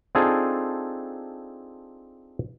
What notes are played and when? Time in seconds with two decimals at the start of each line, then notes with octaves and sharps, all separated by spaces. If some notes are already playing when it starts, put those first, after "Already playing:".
0.15 C4 D4 D#4 F4 G#4 A4